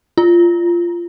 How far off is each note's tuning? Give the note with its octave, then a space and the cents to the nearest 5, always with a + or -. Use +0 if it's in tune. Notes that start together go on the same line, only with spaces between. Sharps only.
F4 -15